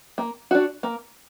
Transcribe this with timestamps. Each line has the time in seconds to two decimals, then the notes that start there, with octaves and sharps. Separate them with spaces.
0.18 A#3
0.51 D4 F#4
0.83 A#3